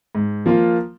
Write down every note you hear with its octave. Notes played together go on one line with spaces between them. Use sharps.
G#2
F3 A#3 F4